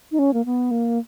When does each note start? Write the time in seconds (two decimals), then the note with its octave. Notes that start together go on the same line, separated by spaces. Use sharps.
0.12 D#4
0.19 C#4
0.34 A#3
0.45 B3
0.71 A#3